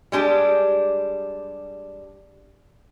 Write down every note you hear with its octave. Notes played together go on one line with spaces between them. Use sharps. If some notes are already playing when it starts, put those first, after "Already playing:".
G3 G#3 D4 G4